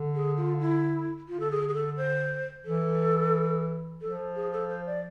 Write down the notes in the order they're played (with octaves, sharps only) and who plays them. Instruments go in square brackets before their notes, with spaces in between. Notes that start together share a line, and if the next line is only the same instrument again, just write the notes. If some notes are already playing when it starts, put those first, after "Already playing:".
Already playing: [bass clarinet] D3
[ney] G#4
F4
E4
[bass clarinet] D3 [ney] F4
[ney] A4
G#4
G#4
A4
C5
[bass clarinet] E3 [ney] A4
[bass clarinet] F3 [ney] A4
[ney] G#4
A4
C5
D5